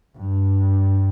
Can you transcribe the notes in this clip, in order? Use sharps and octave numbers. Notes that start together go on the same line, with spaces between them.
G2